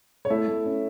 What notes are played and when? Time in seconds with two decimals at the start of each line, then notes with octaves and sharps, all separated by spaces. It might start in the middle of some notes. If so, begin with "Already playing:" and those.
0.25 C#5
0.30 A3 E4 E5
0.48 A3
0.66 C#4